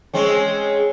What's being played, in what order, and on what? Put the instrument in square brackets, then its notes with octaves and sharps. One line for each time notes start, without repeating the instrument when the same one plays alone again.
[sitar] G#3 C4 C#4